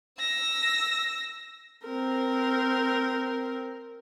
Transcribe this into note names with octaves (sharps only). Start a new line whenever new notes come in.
E6 A#6
C4 A#4